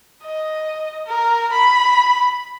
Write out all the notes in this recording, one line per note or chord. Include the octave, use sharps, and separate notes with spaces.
D#5
A#4
B5